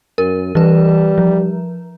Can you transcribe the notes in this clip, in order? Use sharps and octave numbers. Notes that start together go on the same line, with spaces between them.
F#2 A#4
E3 G3 B4
F3